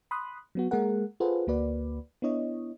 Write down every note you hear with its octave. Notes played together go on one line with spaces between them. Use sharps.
B5 C6 D#6 F#6
F#3 B3 F#4
G#3 A#3 G#4 A#4 F#5
F4 G#4 A4 B4 C5 F#5
D2 A#3 F#4 B4 D5
B3 D4 E4 C#5 D#5